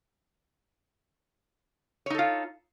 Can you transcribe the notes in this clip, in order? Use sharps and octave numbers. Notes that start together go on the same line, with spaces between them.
D#4 F4 A4 C#5